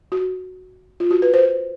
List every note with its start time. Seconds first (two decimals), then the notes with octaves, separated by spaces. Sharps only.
0.12 F#4
1.00 F4
1.11 F#4
1.22 B4
1.34 C5